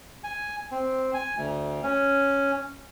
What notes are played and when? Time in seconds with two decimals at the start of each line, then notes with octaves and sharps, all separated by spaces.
0.24 G#5
0.71 C4
1.14 G#5
1.37 D2
1.83 C#4